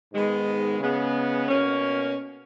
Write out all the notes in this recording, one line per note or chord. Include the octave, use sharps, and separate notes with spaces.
G#2 D#3 G#3 B3
C#3 G#3 B3
B2 A#3 C#4